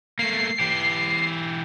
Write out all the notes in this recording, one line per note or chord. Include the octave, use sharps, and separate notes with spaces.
A3 A#3 C7
E3 G4